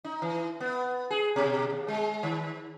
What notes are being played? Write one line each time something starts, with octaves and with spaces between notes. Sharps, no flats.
D#4
E3
B3
G#4
B2
D#2
G#3
D#3